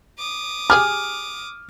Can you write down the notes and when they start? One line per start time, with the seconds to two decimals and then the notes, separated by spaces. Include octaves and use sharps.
0.19 D6 D#6
0.70 G4 G#4 G#5 F6